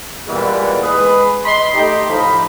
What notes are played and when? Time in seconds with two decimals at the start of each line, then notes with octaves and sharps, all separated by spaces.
0.27 A#2 E3 G3 G#3 B3
0.83 G#3 G#4 B4
1.44 D#5 B5 C6
1.74 A3 D#4 G4
2.08 A2 F3 D#4 B5